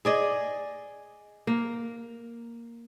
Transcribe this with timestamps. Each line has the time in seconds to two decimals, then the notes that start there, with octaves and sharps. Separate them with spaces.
0.05 G#4 D5 D#5
1.47 A#3